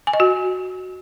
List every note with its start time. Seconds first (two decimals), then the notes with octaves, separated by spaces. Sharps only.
0.07 G#5
0.13 D#5
0.20 F#4